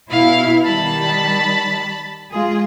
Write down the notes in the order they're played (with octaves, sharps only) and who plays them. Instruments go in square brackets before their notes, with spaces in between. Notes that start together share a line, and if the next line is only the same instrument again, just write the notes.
[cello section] B2 E4 [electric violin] F5
[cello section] D#3 G3 [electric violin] A5 B5
[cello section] G#3 F4 G#4